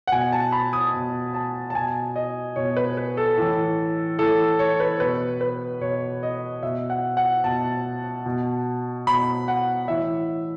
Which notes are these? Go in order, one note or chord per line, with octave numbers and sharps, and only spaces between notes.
F#5
B2 G#5
A5
B5
D#6
B2
A5
A5
B2 G#5
D#5
B2 C#5
B4
B4
A4
A2 E3
A2 E3 A4
C#5
B4
B2 B4
B4
B2 C#5
D#5
B2 E5
F#5
F#5
B2 A5
B2
B2 B5
F#5
A2 E3 E5